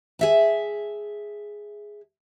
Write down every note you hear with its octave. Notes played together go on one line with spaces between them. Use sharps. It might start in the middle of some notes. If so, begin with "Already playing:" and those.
G#4 E5 A5